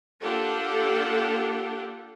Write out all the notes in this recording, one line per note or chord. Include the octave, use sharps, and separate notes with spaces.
A#3 D4 F4 G4 A4 F#5